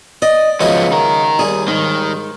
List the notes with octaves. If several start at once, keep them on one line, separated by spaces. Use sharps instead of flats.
D5 D#5
C#3 F3 F#3 G#3 B3 E4
D#4 A#4
D#2 G3 G#4
G#2 D#3